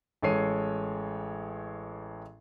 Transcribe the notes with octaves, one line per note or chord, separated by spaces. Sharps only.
A1 G#3 A4 C#5 C7 D#7